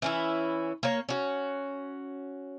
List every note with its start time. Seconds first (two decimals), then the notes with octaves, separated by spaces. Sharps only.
0.02 E3 C#4 E4
0.83 A#3 C#5
1.09 C#4 F#4